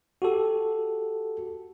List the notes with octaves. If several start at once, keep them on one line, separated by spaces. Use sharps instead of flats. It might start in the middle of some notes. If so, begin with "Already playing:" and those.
F#4 G4 A4